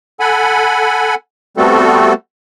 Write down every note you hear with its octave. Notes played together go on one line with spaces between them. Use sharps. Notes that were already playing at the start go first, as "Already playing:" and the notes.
A4 F#5 G#5 B5
G3 A3 B3 C4 F#4 A4